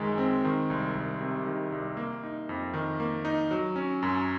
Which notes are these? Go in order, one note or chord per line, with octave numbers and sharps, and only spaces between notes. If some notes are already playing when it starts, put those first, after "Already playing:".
Already playing: F#2 D#3 G#3
C4
D#3
C2
C2
C3
D#3
C2
A#3
D#4
F2
D#3
A#3
D#4
F#3
C#4
F#2